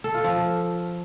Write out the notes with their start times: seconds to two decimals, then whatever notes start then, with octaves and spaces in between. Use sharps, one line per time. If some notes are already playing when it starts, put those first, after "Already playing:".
0.04 A4
0.14 F4
0.24 F3